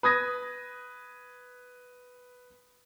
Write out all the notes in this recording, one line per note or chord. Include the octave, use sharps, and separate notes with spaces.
B4 D#6 G#6 A#6